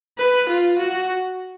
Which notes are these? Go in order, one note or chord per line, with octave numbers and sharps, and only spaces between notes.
B4
F4
F#4